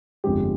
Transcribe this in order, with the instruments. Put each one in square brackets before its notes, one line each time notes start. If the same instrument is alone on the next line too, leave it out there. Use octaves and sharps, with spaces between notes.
[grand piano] G1 F2 D3 G#3 G4